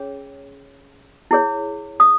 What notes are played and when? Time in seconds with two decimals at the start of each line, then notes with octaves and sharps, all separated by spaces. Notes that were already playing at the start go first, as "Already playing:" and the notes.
Already playing: C#4 G#4 C#5
1.31 E4 G#4 C#5
2.00 D#6